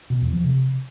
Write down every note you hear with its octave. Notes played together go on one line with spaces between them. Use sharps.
B2
E2
F3
C3